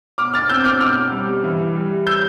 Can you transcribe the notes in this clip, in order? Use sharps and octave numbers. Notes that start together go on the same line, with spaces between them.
B2 D6 F6
F6 A6
C4 E6 G6
D6 F6
B2 D6 F6
G3
E3
G3
E6 G6